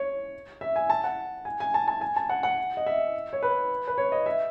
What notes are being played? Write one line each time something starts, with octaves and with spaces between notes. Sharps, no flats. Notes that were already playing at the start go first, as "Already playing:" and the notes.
Already playing: C#5
E5
G#5
A5
F#5
G#5
G#5
A5
A5
G#5
A5
F#5
F#5
D#5
E5
C#5
B4
B4
C#5
D#5
E5